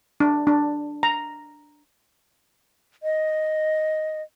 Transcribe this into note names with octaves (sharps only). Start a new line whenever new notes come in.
D4
D4
A#5
D#5